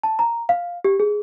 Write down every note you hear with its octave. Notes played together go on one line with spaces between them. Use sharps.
A5
A#5
F5
G4
G#4